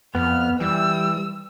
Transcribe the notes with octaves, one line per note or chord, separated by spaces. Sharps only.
F2 B3 F6
E3 G3 E6